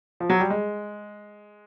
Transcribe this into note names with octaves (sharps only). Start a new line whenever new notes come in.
F3
F#3
G3
G#3